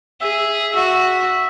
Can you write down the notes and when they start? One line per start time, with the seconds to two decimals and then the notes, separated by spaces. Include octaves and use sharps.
0.21 G#4 E5
0.75 F#4 E5